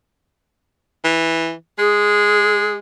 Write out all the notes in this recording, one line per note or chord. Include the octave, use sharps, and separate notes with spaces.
E3
G#3 G#4